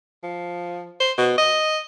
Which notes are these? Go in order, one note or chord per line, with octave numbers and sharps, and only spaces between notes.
F3
C5
B2
D#5